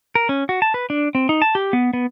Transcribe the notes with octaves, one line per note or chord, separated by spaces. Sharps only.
A#4
C#4
F#4
A5
B4
D4
C4
D#4
A5
G4
B3
B3